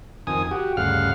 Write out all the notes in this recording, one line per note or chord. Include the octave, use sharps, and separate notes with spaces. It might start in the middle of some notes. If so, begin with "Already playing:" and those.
F2 D#3 G#5 D#6
F#4 G4
D2 G2 C#3 F5 F#5 F6